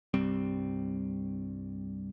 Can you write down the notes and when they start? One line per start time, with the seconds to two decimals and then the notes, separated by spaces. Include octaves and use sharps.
0.14 C2 G2 G3 C4